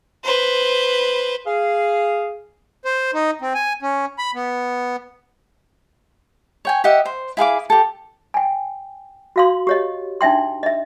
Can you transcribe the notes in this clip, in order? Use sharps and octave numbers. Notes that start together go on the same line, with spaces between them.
B4 C5
G#4 F5
C5
D#4
C4
G#5
C#4
B5
B3
C#5 G5 G#5
G4 D#5 E5 F#5
C5
E4 G#4 F5 D6
G4 A4
G5 G#5
F#4 F5 C6
G4 C#5 D#5
D4 D#4 E5 G5 C6
D#5 E5